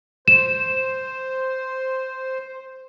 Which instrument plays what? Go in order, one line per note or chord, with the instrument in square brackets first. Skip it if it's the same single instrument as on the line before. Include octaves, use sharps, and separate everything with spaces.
[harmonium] C5 [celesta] E7